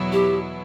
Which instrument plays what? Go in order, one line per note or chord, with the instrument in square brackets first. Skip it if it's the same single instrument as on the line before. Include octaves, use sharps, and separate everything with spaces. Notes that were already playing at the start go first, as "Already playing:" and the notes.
Already playing: [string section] E2 B2 F#3 B3 E4
[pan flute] G4